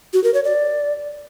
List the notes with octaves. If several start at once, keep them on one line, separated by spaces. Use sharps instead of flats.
F#4
A#4
C#5
D5